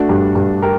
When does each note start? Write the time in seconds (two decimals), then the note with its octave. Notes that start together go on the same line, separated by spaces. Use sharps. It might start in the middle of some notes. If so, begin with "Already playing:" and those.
Already playing: A3 D4 F#4
0.09 G2
0.35 G2
0.62 G4 A#4